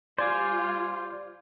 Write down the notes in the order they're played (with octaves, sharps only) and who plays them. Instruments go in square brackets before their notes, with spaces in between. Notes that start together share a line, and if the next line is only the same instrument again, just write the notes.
[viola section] G3 F4 [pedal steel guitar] C5 G#5 [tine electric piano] D5 D6